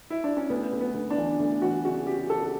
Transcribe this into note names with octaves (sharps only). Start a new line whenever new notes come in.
E4
D4
C#4
D2 B3
D2
B3
D2
D4
E3
D2
E3 F#4
C#3 F#4
C#3 G4
C#3 A4